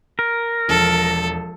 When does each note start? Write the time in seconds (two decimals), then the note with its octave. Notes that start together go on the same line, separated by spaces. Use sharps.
0.19 A#4
0.68 E1 F3 A4